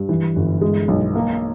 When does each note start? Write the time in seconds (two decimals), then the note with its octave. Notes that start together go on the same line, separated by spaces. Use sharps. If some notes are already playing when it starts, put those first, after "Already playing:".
Already playing: G2
0.09 E3
0.36 G1
0.61 G#3
0.88 B1
1.15 A#3